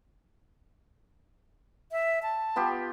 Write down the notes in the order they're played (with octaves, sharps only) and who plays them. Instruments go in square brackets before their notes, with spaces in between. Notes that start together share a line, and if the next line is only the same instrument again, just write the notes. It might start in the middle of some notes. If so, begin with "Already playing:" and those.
[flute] E5
A5
[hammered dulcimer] B3 F4 G4